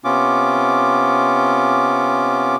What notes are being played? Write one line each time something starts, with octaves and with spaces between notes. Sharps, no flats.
C3 B3 C#4 F4 D6